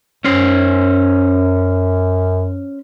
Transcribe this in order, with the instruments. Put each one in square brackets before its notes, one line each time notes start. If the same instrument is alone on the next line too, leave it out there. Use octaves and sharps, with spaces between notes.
[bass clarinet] F#2 [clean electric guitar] C#4 C5